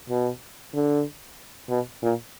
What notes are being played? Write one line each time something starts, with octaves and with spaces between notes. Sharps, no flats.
B2
D3
B2
A#2